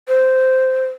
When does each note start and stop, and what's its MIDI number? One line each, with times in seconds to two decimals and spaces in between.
0.08 0.84 72